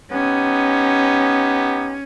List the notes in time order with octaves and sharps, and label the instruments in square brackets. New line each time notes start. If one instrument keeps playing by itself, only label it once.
[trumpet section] B3 D#4 G4 [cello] C#4